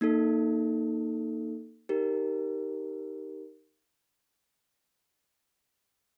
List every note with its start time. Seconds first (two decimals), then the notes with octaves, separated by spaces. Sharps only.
0.01 A#3 D#4 A4
1.89 D#4 G4 A#4